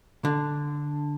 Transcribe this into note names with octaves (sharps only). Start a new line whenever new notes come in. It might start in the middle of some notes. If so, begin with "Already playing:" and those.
D3